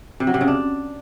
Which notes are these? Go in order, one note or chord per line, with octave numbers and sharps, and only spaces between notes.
C3
F#3
C3
C#3
D4